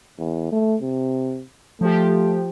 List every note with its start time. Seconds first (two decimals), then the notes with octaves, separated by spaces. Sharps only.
0.19 E2
0.52 A3
0.82 C3
1.81 F3 A3 G4